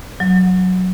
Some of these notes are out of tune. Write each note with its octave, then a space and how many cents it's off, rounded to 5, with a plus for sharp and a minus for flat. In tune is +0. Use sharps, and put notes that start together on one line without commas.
F#3 -5